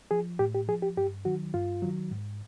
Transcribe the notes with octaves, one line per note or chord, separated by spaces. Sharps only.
F3 G#4
A2 G4
G4
F3 G#4
G4
G2 G4
D#3 F#3 F#4
G2 F4
D#3 F#3
G#2